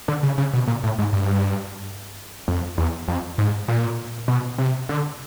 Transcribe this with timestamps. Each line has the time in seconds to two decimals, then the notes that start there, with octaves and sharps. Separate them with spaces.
0.08 D3
0.23 C#3
0.38 C#3
0.53 B2
0.67 A#2
0.84 A2
0.99 G#2
1.13 G2
2.48 F2
2.78 E2
3.08 F2
3.38 G#2
3.68 A#2
4.28 B2
4.58 C3
4.89 D3